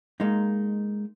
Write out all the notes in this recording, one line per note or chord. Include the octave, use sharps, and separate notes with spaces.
G#3 A#3 D#4